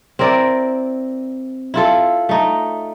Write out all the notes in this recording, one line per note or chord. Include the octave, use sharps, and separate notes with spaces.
C4 E4 A#4 D5
E4 F4 A4
A3 D#4